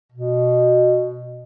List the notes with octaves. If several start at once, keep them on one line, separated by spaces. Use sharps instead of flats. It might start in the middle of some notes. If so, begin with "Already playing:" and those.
B2